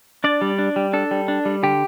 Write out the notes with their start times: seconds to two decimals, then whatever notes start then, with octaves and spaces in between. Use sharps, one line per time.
0.24 D4 D5
0.41 G3
0.59 D4
0.76 G3
0.93 D4 A4
1.11 G3
1.28 D4
1.45 G3
1.63 D3 G4